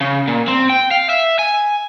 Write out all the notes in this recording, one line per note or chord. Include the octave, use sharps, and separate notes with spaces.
C#3
A#2
C4
G5
F5
E5
G#5